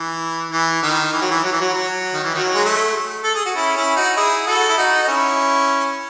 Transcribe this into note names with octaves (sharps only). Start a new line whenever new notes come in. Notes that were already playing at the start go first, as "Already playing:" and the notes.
Already playing: E3
E3
D#3
E3
F#3
E3
F#3
E3
F#3
F#3
D#3
E3
D#3 F#3
G#3
A3
A4
G#4
F#4
C#4 E4
C#4 E4
D#4 F#4
E4 G#4
F#4 A4
E4
D#4 F#4
D#4
C#4 E4